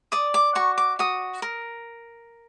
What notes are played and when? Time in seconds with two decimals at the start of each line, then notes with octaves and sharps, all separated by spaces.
0.12 D5 D#6
0.34 D6
0.55 F#4 C#6
0.78 D6
0.99 F#4 D#6
1.42 A#4